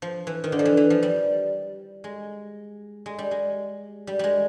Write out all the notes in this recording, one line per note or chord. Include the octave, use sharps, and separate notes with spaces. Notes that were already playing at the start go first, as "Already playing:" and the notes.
F3
E3
D#3
D3
F3
E3
E3
F3
G3
G#3
G#3
G3
G#3
G3
G3 G#3